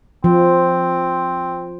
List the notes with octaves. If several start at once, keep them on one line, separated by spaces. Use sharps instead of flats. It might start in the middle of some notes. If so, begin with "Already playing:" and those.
F3 C4